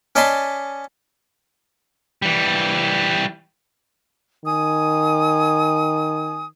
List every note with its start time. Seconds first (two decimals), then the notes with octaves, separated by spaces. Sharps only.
0.16 C#4 D5 D#5 A5 B5 C6
2.22 E3 G3
4.45 D#3 G#5 D#6